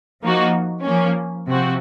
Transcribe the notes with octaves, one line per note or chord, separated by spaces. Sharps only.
F3 A#3 D#4 F#4
F3 A#3 C#4
C3 F3 C4 F#4